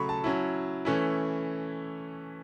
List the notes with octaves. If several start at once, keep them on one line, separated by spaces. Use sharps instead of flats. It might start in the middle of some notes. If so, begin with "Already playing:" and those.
Already playing: C#3 F#3 A3 B5 C#6
A5
F#3 C#4 E4
E3 A3 C#4 E4